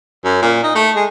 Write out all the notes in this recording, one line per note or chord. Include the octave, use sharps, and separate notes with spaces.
F#2
A#2
D#4
A3
G#3